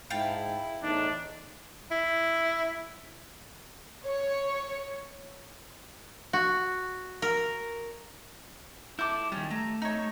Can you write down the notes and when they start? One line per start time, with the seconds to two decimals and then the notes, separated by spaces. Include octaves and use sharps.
0.10 G#2 E4 F5 G5 A5
0.83 E2 A2 D4 D#4
1.91 E4
4.07 C#5
6.33 F#4
7.22 A#4
8.99 E4 A4 D6 G6
9.32 D#3 G3 C#4 A5
9.51 A3 A#5
9.82 D#4 C#5